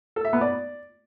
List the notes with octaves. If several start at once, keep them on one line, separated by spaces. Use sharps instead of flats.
A4
E5
B3
D5